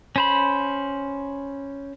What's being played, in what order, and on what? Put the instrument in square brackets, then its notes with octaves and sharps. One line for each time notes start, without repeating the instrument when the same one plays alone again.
[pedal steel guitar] C#4 C5 B5